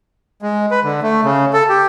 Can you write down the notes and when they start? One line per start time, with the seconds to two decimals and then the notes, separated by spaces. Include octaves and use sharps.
0.42 G#3
0.71 B4
0.84 D3
1.03 A3
1.24 C#3
1.53 A4
1.69 G4